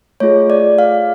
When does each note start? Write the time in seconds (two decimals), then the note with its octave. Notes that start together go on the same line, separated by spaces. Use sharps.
0.20 A3 F4 G#4 C#5
0.50 D5
0.78 F5